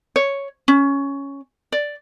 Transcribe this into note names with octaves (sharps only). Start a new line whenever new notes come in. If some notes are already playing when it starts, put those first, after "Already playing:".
C#5
C#4
D5